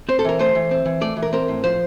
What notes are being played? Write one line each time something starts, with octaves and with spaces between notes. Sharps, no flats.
C4 C5
A4
E3 A#4
A3 C5
E3
C4
E3
A3 D5
E3
A#4
C4 A#4
A2
F3 C5